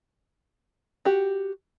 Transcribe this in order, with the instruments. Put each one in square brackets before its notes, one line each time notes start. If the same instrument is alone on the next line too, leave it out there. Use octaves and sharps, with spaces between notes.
[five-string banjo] F#4 G4